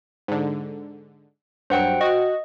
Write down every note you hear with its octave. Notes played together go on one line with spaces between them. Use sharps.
G#2 D3
G2 F#3 C5 F#5 G5
F#4 D#5